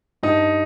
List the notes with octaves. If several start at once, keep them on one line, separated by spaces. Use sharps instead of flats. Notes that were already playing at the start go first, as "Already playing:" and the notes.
G2 D#4